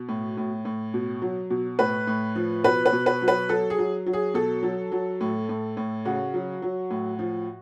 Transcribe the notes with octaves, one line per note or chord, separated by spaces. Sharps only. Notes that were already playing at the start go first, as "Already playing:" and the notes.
Already playing: B2
A2
A2
A2
B2
F#3
B2
A2 B4
A2
F3
B2 B4
B4
B2
B4
F#3
B4
F#3 A4
G#4
F#3
F#3
G#4
B2 A4
F#3
F#3
A2
A2
A2
C#3 F#4
F#3
F#3
A2
F3